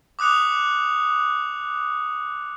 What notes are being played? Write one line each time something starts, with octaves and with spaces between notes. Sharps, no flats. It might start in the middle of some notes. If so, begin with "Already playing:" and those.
D6 D#6 F#6 C#7 F7